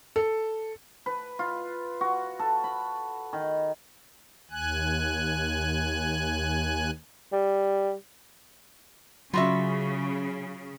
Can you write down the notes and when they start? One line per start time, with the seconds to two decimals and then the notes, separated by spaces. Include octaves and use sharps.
0.16 A4
1.06 B4
1.39 F4
2.01 F#4
2.39 A4
2.64 B5
3.33 D#3
4.51 D#2 G#5 F#6
7.33 G3
9.34 C#3 F#3 F4 F#4 E5 B5